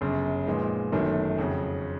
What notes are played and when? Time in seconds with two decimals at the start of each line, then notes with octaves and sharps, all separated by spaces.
0.01 G1 F#2 C#3 F#3
0.47 A#2 F3 G#3 B3 D#4
0.92 G1 F#2 D#3 F#3 A3
1.38 F2 C#3 F#3